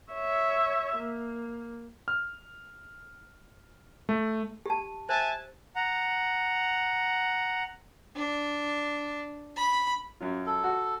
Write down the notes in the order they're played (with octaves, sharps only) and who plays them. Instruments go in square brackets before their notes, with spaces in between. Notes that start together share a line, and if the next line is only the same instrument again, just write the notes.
[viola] C#5 E5
A#3
[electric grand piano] F6
A3
[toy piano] G4 A5
[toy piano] C5 [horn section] E5 G#5 A5
[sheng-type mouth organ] F#5 A#5
[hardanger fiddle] D4
B5
[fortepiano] F#2 F#3 F4
[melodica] A4
[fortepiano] F#4